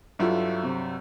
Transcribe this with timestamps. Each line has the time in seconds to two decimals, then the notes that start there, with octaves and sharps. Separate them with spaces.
0.19 G2 F#3 E4 F4 A4
0.63 C3